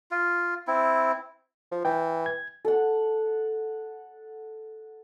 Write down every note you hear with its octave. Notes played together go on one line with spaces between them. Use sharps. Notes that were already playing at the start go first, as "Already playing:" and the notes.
F4
C4 E4
F3
E3 G5
G#6
A4 F#5